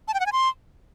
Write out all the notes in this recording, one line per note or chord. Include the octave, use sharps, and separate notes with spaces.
A5
G5
F#5
G#5
C6